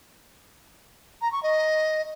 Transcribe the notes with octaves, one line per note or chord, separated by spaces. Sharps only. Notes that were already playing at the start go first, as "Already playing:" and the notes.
A#5
C#6
D#5